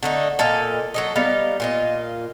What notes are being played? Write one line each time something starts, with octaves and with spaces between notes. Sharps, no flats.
D3 A3 D#4
A#2 A4 D#5 F5
F#3 A4 D#5
G3 B3 D#4 F5
A#2 F4 D#5